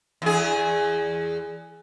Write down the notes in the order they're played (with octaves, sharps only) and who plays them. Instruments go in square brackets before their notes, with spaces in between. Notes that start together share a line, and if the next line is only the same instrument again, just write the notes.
[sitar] E2 G#4